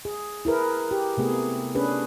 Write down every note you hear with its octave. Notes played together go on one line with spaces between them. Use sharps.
G#4
E4 G#4 A#4 B4
G4
C3 A3 B3 G#4
C#4 D4 G#4 B4